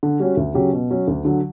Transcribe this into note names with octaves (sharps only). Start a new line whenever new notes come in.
D3
G3 C#4 F#4
D2
C#3 F#3 C#4 G4
B2
F#3 C#4
D2
D3 F#3